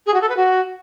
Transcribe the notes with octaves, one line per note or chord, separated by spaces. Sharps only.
G#4
F#4
A4
B4
F#4